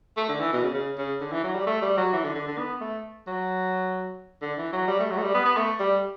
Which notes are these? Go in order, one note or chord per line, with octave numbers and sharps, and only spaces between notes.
A3
D3
E3
B2
C#3
C#3
C#3
D3
E3
F#3
G3
A3
G3
F#3
E3
D3
D3
D3
B3
A3
F#3
D3
E3
F#3
G3
A3
F#3
A3
G3
B3
B3
A3
G3